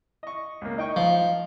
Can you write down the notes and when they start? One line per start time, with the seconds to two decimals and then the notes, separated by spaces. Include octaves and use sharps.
0.23 D#5 C#6
0.61 C#2 A#3
0.78 D#4 G5 C#6
0.96 F3